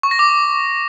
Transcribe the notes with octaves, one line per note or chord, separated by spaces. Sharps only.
C#6
A#6
D6